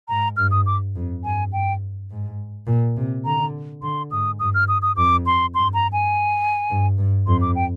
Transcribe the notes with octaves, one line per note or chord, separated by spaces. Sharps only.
G#2 A#5
G2 F6
D#6
D6
F2
G2 G#5
G2 G5
G#2
A#2
C3
D3 A#5
D3 C6
G#2 D#6
G2 D#6
F6
D#6
D#6
F2 D6
C6
G2 C6
A#5
G#5
G2
G2
F2 C6
D6
G5